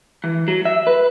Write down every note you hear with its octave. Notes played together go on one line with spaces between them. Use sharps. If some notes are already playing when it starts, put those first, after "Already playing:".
E3
F#3
E5
B4